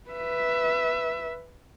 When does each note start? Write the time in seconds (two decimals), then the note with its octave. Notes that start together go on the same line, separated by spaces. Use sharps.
0.10 B4 E5